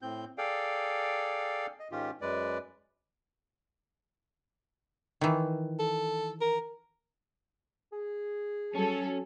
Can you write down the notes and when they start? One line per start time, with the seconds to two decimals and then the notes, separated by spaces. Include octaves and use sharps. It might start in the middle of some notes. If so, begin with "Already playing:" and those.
0.02 A2 C4 G6
0.38 G#4 A4 D5 F5 G5
1.80 D#5
1.91 G#2 D#3 C#4 F4 G4
2.21 F#2 G#3 B4 D5
5.21 D#3 E3
5.79 A4
6.41 A#4
7.92 G#4
8.75 F#3 C#4 A4